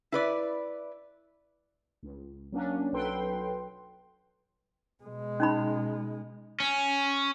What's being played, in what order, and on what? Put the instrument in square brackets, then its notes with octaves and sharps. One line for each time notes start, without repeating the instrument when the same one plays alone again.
[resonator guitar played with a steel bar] E4 B4 D5
[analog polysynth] C#2
F#3 A#3 C#4 D4
B1 F#3 A4 B4 G5 C6
[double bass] B2 G#3
[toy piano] C#4 D#4 B5
[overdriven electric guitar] C#4